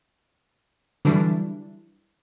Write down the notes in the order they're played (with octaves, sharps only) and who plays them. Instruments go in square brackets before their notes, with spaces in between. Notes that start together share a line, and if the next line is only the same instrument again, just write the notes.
[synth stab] D3 E3 F#3 G3 D4 E4